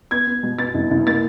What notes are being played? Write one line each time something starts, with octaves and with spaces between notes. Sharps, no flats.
B3 G#6
B3
B2
B3 A6
C2
C2
A#3 A6